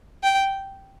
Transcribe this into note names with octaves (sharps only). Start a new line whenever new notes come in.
G5